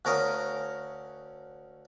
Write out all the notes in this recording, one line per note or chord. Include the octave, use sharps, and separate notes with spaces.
D2 C#4 A#4 F5 D#6